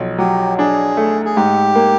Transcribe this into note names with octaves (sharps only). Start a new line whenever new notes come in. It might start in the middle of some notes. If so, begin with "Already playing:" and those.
Already playing: B1 F3
F#3 G4
D4 G#4
A3
G#4
G#2 G4
A#3